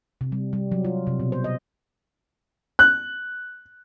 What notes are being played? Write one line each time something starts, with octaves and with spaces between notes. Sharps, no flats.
C3
G3
G3
F#3
F4
C3
B2
C5
D#5
F#6